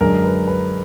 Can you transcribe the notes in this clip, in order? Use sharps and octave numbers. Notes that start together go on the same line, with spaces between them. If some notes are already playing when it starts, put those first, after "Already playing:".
F#2 D3 G#3 A#4
B4
B4